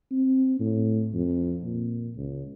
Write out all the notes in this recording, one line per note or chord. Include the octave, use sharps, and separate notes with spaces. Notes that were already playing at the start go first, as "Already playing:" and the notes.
C4
A2
F2
A#2
C#2